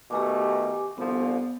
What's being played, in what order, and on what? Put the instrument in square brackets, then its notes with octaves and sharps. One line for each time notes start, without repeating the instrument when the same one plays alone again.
[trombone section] B2 D#3 A3 [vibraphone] G4 G#5 D6
[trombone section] C2 D3 F3 [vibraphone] B3